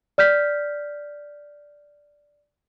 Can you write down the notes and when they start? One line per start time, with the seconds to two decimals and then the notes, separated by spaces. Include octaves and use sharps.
0.18 D5 F6 G6 B6